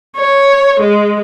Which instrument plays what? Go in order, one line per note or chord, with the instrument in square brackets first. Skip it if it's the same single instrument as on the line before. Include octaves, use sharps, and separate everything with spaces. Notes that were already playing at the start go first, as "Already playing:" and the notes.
[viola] C#5
G#3